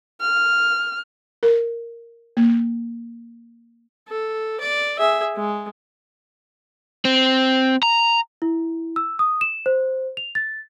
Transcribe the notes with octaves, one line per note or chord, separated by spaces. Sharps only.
F6
A#4
A#3
A4
D5
G#4 E5
G#3
C4
A#5
E4
E6
D#6
E7
C5
F7
A6